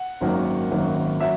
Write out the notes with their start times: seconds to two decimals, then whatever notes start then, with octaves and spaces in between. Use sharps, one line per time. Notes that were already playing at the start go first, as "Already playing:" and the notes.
Already playing: F#5
0.21 G#1 F#2 D#3 F#3 A#3
0.71 G#1 F#2 D#3 F#3 A#3
1.20 F#3 E5